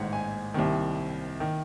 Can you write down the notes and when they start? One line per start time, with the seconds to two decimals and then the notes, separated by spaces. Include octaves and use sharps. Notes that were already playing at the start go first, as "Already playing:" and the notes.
Already playing: A1 G#2 D#3 F#5
0.13 G#5
0.54 C2 C3 D#3
1.40 D#3